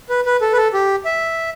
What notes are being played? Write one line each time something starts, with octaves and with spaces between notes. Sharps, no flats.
B4
B4
A4
B4
A4
G4
E5